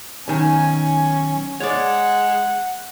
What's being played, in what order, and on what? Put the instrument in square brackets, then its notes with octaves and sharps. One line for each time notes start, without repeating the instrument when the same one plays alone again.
[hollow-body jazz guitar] B1 D#3 [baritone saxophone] C#4 [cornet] G#5
[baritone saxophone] G#3 [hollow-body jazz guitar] C#5 D5 [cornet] F#5